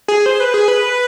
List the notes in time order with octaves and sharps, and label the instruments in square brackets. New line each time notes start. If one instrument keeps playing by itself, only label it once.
[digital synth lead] G#4
C5
B4
G#4
B4